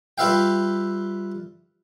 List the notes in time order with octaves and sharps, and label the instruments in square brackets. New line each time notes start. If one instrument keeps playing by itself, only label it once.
[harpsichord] G3 F4 B4 E5 F5 G5